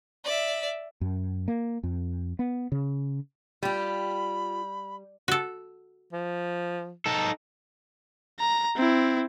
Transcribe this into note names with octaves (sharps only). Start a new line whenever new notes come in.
D5 E5
F#2
A#3
F2
B3
C#3
G3 F4 G4 B5
F#4 A4
F3
D#4 A4
A#5
C4 E4